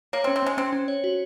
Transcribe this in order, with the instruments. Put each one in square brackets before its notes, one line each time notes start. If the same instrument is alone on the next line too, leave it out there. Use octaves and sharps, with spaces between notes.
[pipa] A#3 [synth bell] C#5
[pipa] C4
[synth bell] C#4
[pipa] C4
[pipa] G#3 [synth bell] C#4
[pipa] C4 [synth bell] C#4
[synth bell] C#4
C#5
F#4